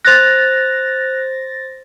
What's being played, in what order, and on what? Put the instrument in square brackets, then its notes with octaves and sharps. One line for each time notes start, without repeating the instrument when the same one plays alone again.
[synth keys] C5 A6 A#6 [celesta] F#6 F7